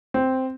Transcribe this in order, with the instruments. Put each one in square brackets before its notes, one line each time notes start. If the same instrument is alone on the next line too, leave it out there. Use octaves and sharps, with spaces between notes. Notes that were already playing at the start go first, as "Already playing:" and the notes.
[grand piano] C4